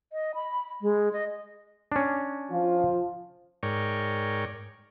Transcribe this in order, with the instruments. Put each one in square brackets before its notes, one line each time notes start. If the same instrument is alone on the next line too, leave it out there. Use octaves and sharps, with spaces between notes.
[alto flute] D#5
B5
G#3
D#5
[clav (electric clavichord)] C#4 D4
[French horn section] F3 F4
[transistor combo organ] G#2 A#4 C#5 D5 G5 C#6